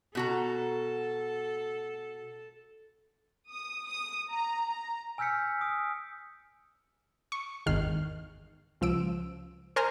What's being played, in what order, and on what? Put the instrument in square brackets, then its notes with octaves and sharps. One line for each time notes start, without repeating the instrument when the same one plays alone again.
[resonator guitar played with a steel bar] B2 F#4 A#5 [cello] A4
[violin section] D#6
D#6
A#5
A#5
[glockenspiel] G#5 E6 F6 G6 B6 C#7
D#6 D7
[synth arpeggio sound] C#6
G#1 E2 D#3 F6 C7
C#2 F3 E6 D7
A#4 C5 G#5 A#5 C6 F6